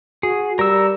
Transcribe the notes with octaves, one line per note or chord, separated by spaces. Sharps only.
F#4 G#4
G3 A#4 E6